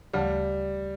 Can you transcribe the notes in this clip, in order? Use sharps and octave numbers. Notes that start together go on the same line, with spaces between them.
D2 C#3 F3 G3 A3